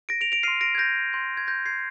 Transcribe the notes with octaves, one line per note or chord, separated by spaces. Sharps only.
A#6 D7
D7 F7
D7 F7
C6 F6 C7 D#7
A#6 D7
G#6
G6 A#6
C6 G6
G#6
G6 A#6
G#6 C7